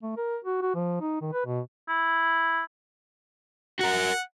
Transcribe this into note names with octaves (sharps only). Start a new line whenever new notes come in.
A3
A#4
F#4
F#4
F3
D#4
D#3
B4
B2
E4
F#4 A#4 F#5